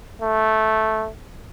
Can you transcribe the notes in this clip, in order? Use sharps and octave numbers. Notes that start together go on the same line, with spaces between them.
A3